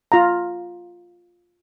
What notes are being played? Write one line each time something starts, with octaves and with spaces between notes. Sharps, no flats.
F4 F5 A#5